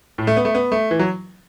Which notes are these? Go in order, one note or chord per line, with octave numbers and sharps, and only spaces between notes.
A2
A3
B3
A3
B3
A3
E3
F#3